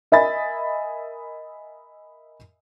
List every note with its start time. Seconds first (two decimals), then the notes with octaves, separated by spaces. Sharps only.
0.12 A#4 D#5 E5 G#5 B5 A6